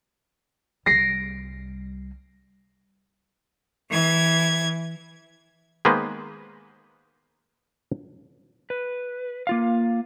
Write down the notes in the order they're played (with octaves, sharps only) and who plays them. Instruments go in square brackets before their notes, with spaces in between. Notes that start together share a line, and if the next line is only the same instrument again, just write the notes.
[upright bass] C2 G3 [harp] A#6 C7 D7
[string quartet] E3 G#6
[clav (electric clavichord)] D#3 G#3 A#3 B3 B4 C5
[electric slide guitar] B4
A#3 F4 F5